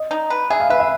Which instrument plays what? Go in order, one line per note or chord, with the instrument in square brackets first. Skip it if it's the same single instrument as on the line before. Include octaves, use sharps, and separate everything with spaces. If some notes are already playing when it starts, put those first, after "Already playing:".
Already playing: [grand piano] D#5
[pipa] D#4
B4
[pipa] G#4 [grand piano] E5
[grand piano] F5
[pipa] B4 [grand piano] E5
[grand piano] E5